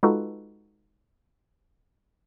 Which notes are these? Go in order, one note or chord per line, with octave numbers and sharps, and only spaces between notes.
G#3 D#4 F4 F#4 A4 B4